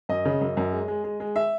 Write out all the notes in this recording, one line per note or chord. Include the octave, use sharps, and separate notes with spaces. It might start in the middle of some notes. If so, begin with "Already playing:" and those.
F#2 D#5
C#3
F#2
F#2
G#3
G#3
G#3
G#3
E5